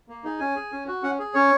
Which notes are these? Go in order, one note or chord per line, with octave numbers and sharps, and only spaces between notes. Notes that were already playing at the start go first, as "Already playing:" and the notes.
A#3
D#4 G#4
C#4 G#5
G#4
C#4
F#4
C#4 F#5
G#4
C#4 C#5